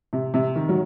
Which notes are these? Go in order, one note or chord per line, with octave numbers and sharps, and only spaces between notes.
C3
C3
D#3
F#3